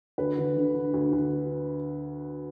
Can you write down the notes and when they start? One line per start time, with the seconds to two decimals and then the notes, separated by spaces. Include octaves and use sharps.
0.18 D2 B4
0.38 D3
0.56 D3
0.74 D3
0.94 D2
1.12 D2